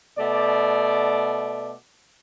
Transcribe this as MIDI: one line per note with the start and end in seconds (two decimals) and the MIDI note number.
0.17 1.72 47
0.17 1.72 57
0.17 1.72 74